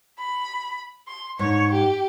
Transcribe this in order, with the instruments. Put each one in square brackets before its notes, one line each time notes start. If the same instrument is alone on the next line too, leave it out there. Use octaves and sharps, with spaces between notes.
[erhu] B5
C6
[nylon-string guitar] G#2 D4 [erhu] C#5
[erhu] G4